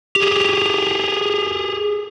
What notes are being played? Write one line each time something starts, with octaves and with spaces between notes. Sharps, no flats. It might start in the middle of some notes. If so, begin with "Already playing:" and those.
G4 G#4